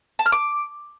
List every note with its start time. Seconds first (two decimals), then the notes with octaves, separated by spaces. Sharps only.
0.19 A5
0.26 F6
0.32 D6